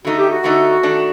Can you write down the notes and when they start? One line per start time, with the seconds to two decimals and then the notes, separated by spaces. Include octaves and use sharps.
0.05 D3 A3 D#4 F#4
0.18 G4
0.31 F#4
0.44 D3 A3 D#4
0.83 D#3 A3 D4